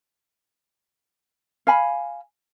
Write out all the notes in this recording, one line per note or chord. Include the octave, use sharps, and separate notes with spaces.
F5 G#5 B5